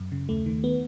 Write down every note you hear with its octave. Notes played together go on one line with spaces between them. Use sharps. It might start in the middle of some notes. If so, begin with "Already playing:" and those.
Already playing: F#2
C#3
D#2 A3
D#3
B3